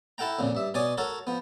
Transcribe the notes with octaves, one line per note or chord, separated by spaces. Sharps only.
E4 A4 F#5 G5 A#5
F2 A#2 C#3
G2 E5
B2 C#5 D5 G#5 D#6
F#4 A4 A#4 C#5
F3 B3